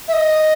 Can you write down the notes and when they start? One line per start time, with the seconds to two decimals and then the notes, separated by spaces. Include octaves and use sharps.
0.08 E5
0.13 D#5